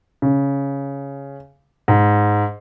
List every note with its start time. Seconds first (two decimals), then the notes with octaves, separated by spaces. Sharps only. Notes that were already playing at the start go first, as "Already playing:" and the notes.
0.22 C#3
1.88 G#2